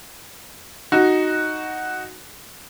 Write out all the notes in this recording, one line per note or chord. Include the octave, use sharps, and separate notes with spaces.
D#4 F#4